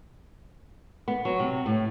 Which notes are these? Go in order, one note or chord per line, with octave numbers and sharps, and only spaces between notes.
B3
F#3
C3
A2